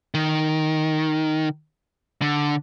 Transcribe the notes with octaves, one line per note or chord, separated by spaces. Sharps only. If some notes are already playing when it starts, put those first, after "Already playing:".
D#3
D3